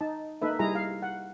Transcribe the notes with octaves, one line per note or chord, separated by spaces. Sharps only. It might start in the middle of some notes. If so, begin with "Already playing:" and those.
D#4 A5
A#3 D#4 A4 B4 E5
G3 E4 G#4 A#5
F5
F#5